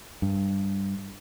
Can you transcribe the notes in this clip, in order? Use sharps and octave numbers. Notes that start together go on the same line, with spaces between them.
G2